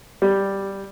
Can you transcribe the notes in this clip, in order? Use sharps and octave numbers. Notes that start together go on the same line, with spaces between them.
G3